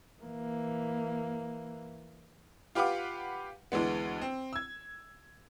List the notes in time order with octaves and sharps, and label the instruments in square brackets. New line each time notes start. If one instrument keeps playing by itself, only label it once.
[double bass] E3 A#3
[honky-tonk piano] F4 G4 B4 F5 F#5 D6
D2 E3 G#3 B3
C4
E6 G#6